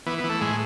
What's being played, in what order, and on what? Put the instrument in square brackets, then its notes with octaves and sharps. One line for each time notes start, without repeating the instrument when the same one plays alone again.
[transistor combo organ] E3 B3
B3
E3
A3
A2 G#3